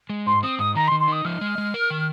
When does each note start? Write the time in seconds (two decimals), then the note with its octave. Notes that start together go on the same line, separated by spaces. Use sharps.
0.10 G#3
0.26 G#2 C6
0.43 C4 D#6
0.59 G#2 D#6
0.75 D#3 A#5
0.87 C6
0.92 D#3
1.00 C6
1.08 D#4 D#6
1.25 F3 F6
1.41 G#3
1.58 G#3
1.74 A#4
1.90 D#3